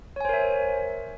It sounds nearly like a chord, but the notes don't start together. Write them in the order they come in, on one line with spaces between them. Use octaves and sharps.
C#5 G#5 C5 A#4 E5